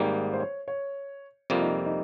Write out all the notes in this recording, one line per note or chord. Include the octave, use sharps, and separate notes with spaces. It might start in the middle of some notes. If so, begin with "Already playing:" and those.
Already playing: G#1 G#2 G3 A#3
C5
C#5
C#5
F2 C3 G3 A#3 F4
D#4
D#4